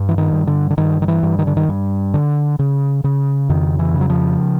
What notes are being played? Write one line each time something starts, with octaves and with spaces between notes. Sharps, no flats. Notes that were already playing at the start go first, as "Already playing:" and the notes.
Already playing: G2
E3
D#3
G2
D3
D3
G2 D#3
D#3
E3
G2
D#3
D3
D#3
G2
D3
C#3
C#3
F2 D#3
E3
C#3
F#3
F3